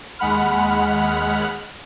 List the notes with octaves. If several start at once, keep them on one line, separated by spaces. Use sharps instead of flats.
D#2 G#3 F#5 B5 F6